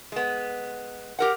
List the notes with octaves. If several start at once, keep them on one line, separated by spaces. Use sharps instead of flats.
G#3 B3
G4 A#4 F#5